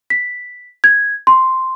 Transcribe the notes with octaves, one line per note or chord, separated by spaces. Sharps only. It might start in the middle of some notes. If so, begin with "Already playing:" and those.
B6
G#6
C6